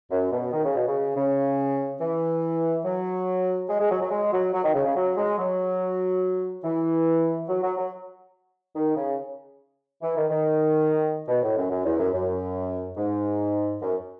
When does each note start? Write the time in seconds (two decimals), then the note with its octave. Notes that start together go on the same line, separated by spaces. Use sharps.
0.11 F#2
0.32 B2
0.53 D#3
0.64 C#3
0.76 B2
0.87 C#3
1.16 C#3
2.01 E3
2.85 F#3
3.69 G#3
3.80 G#3
3.91 F#3
4.01 F#3
4.11 G#3
4.32 F#3
4.53 F#3
4.64 D#3
4.74 C#3
4.85 C#3
4.96 F#3
5.17 G#3
5.38 F#3
6.64 E3
7.49 F#3
7.63 F#3
7.77 F#3
8.76 D#3
8.96 C#3
10.02 E3
10.17 D#3
10.30 D#3
11.28 B2
11.42 A2
11.57 F#2
11.70 F#2
11.85 E2
11.99 F#2
12.13 F#2
12.97 G#2
13.82 F#2